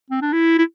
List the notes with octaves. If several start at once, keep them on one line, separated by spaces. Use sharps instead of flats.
C4
D4
E4
E4